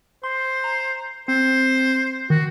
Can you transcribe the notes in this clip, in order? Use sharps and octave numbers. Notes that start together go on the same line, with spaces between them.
C5 C6
A#5
C4 C5
D#3 F#4